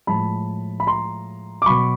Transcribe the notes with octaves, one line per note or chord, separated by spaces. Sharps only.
A2 F3 G#3 A5 B5
B5
A#5 C6
D6
B2 F#3 B5 C#6